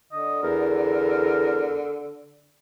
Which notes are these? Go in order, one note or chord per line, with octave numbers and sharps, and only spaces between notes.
D3 D#5
E2 A#4